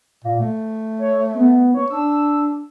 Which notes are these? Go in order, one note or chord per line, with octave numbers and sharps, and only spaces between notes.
A#2
A3
C#5
B3
C#5
D4 E6